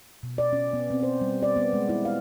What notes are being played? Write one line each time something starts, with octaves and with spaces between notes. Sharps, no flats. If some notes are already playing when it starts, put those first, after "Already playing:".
B2
D5
C#4
B3
C4
C5
G3
D5
B3
G#3
E4
F5